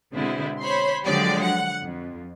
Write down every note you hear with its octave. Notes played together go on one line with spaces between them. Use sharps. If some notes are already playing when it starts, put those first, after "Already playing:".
B2 D3 G#3 C4 E4
C5 C#5 B5 C6
D3 F3 F#3 G#3 G4 D5
F#5
F2